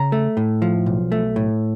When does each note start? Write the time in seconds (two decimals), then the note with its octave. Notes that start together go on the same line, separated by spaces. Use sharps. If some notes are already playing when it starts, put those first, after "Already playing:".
Already playing: C#3 A#5
0.12 A3
0.37 A2
0.62 F3
0.86 B1
1.12 A3
1.36 A2